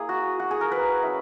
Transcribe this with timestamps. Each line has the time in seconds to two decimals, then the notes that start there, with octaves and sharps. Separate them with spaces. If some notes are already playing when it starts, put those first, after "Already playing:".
Already playing: A#3 E4 G#4
0.09 F#4
0.40 F#4
0.51 G#4
0.61 A#4
0.72 B4
1.02 F#3 C#4 E4